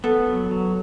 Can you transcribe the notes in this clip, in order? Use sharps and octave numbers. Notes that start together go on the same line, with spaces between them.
B3 A4
F#3
F#3